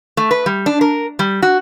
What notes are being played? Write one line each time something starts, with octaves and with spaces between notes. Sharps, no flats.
A3
B4
G3
D4
A#4
G3
F#4